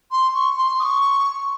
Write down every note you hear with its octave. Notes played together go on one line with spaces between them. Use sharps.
C6
C#6
C6
D#6
C#6